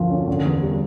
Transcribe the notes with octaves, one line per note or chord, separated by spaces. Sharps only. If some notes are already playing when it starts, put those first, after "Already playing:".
Already playing: D2 D3 F3
C#4
D3
E2
G3